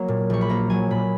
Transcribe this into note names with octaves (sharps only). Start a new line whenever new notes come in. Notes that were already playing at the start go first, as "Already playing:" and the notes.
Already playing: F#3 A#3 A#5
A#2
A#1 C#6
B5
A#3 A#5
F#3 G#5
A#2 B5